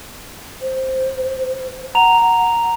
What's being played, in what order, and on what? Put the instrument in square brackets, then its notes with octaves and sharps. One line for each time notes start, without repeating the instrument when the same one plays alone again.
[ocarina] C5
[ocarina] F#5 [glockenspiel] A#5 F7